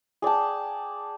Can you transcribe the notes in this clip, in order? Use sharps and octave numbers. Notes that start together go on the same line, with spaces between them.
G#4 D5 G5 A5